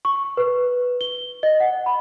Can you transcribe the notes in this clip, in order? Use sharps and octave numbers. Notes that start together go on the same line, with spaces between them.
C#6
B4
G7
D#5
F#5
B5